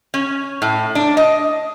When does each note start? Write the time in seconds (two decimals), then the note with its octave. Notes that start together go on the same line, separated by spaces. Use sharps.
0.14 C#4
0.62 A2
0.95 D4
1.17 D#5